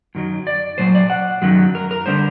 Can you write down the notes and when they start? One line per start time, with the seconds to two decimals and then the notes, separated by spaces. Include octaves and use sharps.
0.15 F#2 D#3 F#3
0.47 D5
0.78 A#2 F#3 C5
0.95 D5
1.10 F#5
1.42 F#2 D#3 F#3
1.75 A#4
1.91 A#4
2.06 D3 G3 C5